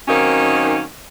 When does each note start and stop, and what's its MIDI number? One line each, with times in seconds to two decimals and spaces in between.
0.08 0.81 51
0.08 0.81 54
0.08 0.81 58
0.08 0.81 60
0.08 0.81 61
0.08 0.81 63